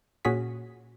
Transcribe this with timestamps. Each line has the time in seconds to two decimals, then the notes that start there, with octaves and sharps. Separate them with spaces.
0.25 A#2 C#4 F#4 G#4 B6